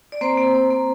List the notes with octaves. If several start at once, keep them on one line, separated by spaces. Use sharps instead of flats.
D5
A#3 C4 C5
A#3
A#3
A#3